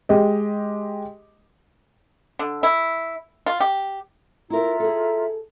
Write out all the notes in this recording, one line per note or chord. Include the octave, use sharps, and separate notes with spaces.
G#3 G4 D#5
D3
E4
F4
G4
E4 F4 A#4 E5 A#5
G#4 A4